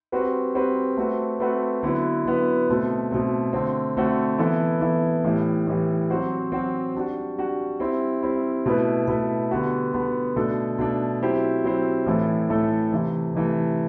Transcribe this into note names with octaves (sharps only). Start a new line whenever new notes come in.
G3 C4 F#4 B4
G3 C4 F#4 B4
A3 C4 F#4 B4
A3 C4 F#4 B4
D3 F#3 B3 E4 B4
D3 F#3 B3 E4 B4
B2 A3 C4
B2 A3 C4
D3 A3 C4 F#4
D3 A3 C4 F#4
E3 B3 E4 A4
E3 B3 E4 A4
A2 E3 G3
A2 E3 G3
F#3 C4 F#4 C5
F#3 C4 F#4 C5
G3 D4 F#4
G3 D4 F#4
G3 C4 E4
G3 C4 E4
B2 A3 E4 B4
B2 A3 E4 B4
D3 G3 B3 F#4
D3 G3 B3 F#4
B2 A3 D4 A4
B2 A3 D4 A4
F#3 C4 E4 G4 C5
F#3 C4 E4 G4 C5
A2 E3 A3 E4 A4
A2 E3 A3 E4 A4
C3 E3 A3
C3 E3 A3